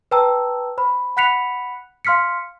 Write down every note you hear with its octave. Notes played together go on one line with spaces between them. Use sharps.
B4 C5 G5 A5 A#5 E6
C5 B5
F#5 B5 F#6 B6 C#7 F7
F5 C6 F6 B6 C#7